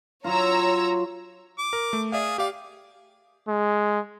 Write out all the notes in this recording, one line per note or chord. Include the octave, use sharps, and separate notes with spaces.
F#3 F4 C#5 A#5 E6
D6
A#4
A3
G#4 D5 E5 F5
G4 D5 F5
G#3